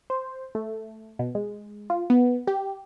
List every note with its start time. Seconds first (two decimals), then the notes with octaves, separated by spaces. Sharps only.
0.10 C5
0.55 A3
1.19 B2
1.35 G#3
1.90 F4
2.10 B3
2.47 G4